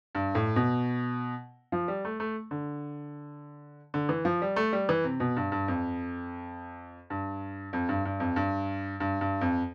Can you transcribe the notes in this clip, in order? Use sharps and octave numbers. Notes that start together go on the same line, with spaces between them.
G2
A2
B2
F3
G3
A3
A3
D3
D3
E3
F3
G3
A3
G3
E3
C3
B2
G2
G2
F2
G2
F2
G2
G2
F2
G2
G2
G2
F2